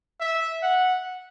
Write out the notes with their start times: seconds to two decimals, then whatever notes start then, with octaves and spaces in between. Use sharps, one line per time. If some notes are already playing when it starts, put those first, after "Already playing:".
0.21 E5
0.63 F#5